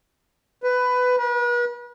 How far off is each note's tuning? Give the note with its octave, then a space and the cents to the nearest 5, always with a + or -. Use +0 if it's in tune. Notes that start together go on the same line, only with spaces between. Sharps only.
B4 +15
B4 -40